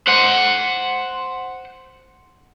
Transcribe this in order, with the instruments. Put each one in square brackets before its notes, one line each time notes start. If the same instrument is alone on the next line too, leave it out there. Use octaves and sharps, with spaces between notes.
[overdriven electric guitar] C5 F#5